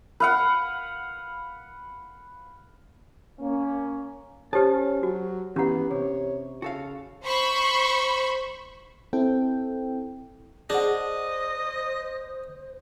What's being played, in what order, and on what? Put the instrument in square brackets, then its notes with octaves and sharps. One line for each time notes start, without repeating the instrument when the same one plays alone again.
[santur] B4 F5 F#5
[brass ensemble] A#3 C#4
[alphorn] C#4 [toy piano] G4 A4 [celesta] C5 C#5 F6 [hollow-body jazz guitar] A5
[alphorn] F#3 [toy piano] F#4
[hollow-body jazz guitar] E3 [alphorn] B3 [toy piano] C#4 F#5 [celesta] G4 A#5
[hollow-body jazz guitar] C3 [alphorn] C#5
[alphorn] C#3 [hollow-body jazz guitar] F#4 A4 F5
[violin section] C5 B5 C#6
[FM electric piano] C4 E4 A4 G5
[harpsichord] D4 [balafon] G#4 F#5 [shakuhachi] C5 [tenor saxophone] D#5